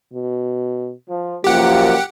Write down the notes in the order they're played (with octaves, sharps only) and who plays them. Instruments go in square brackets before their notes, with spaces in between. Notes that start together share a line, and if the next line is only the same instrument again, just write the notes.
[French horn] B2
[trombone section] F3
[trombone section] C#2 F#2 A#3 [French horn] F3 [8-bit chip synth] G4 F#5